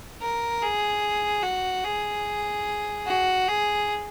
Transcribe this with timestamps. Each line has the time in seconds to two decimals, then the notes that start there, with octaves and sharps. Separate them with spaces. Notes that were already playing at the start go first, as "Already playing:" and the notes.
0.21 A#4
0.62 G#4
1.43 F#4
1.84 G#4
3.07 F#4
3.48 G#4